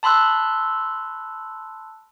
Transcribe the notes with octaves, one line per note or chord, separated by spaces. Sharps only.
A5 B5 C6 E6 F#6